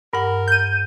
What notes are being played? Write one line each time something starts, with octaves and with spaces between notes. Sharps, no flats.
G2 A#4 F#5
G6 D#7